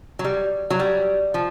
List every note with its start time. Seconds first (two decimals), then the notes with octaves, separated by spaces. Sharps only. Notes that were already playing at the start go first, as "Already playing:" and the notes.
0.19 F#3
0.24 G3
0.70 F#3
0.80 G3
1.34 F3